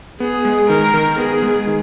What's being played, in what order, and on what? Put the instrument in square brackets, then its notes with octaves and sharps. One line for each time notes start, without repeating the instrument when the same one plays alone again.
[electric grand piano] B3 [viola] G#4
[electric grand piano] G#3
[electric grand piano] D#3 [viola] A#4
[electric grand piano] D#3
[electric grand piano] B3 [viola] G#4
[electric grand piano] G#3
D#3